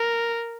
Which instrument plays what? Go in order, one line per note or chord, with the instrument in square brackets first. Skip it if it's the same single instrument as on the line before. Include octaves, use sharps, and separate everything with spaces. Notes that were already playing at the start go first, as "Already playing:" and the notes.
Already playing: [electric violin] A#4